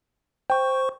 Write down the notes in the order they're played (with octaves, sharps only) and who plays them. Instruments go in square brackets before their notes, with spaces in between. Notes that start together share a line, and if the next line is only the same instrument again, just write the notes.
[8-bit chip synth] C5 C#6 [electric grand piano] G5